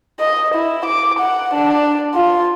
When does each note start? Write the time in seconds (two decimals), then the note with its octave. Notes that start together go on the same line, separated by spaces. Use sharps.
0.20 D#5
0.55 E4
0.85 D6
1.19 F#5
1.54 D4
2.15 F4